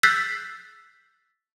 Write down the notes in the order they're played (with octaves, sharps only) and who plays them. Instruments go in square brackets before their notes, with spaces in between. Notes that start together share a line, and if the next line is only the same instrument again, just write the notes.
[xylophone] E6 F#6 G6 A6 B6 C7